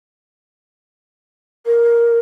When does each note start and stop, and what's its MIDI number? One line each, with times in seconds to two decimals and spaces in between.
1.66 2.20 70